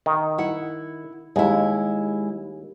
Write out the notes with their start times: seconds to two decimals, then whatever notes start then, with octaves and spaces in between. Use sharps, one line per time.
0.06 D#3
0.38 E4 F#5
1.36 D#2 G#3 E4